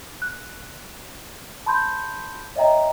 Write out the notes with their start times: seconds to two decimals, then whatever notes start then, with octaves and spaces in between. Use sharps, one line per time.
0.22 F#6
1.66 A5 B5 C6 G6
2.56 C#5 D#5 E5 G5 A#5